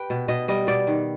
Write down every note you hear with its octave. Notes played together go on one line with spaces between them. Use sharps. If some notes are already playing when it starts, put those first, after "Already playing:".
Already playing: G4 B4 G5
B2
B2 D#5
G3 D#5
B2 D5
D#3